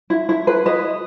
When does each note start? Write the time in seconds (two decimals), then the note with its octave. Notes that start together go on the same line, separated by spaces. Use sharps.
0.10 E4
0.29 E4
0.47 B4
0.66 B4 D#5